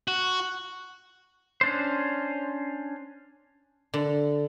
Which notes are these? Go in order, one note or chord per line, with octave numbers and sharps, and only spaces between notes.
F#4
C#4 D4 C5
D3